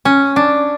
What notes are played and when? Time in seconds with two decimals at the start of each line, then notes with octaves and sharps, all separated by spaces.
0.05 C#4
0.36 D4